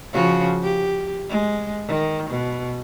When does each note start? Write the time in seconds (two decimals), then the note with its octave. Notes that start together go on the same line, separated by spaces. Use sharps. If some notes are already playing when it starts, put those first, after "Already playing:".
0.13 C#3 F3 F#4
0.63 G4
1.29 G#3
1.87 D#3
2.29 B2